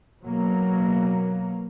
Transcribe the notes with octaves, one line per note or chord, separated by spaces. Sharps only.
B2 F#3 A#3